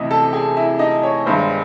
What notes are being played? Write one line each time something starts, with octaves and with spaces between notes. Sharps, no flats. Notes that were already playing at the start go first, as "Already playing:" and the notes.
Already playing: D2 C3 E3 D#5 E5 D#6
A4 A5
G#4 G#5
E4 E5
D#4 D#5
C#5
G1 G2 D#3 G#3 C5